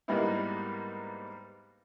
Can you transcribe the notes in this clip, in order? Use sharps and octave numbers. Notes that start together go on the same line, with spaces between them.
G#2 G3 A#3 B3 D#4 E4